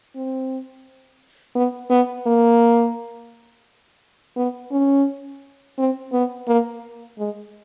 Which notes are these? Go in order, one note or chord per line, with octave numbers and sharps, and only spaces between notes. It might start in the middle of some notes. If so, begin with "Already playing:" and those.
C4
B3
B3
A#3
B3
C#4
C4
B3
A#3
G#3